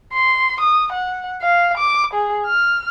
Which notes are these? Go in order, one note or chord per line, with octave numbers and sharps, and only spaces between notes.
C6
D#6
F#5
F5
D6
G#4
F6